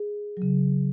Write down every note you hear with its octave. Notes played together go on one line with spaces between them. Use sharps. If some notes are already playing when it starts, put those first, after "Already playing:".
Already playing: G#4
C#3 F#3